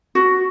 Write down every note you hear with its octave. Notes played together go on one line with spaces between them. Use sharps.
F#4